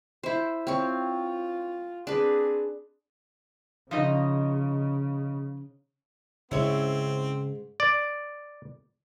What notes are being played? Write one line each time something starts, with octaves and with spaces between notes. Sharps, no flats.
E4 C5
C4 F4 C#5
C4 D4 G#4 B4
C#3 F3 D#4 D#5
G#2 C#3 C4 C#4 E4 C#5
D5